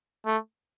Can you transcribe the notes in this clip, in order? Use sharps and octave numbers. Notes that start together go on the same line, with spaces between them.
A3